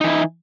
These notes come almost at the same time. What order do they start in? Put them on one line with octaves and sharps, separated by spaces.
D#4 E3 E4